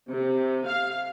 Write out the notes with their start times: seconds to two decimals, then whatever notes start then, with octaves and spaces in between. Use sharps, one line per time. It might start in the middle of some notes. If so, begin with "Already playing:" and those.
0.11 C3
0.67 F5